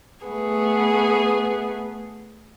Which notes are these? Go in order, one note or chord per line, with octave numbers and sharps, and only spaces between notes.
A3 B3 G#4